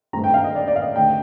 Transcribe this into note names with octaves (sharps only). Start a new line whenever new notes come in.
G2 D#3 A3 C4 A#5
G5
F5
D#5
D5
D5
F5
D#5
D2 D3 A3 G5